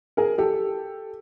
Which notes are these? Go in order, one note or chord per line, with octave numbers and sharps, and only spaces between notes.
G#4 A#4
G4 A4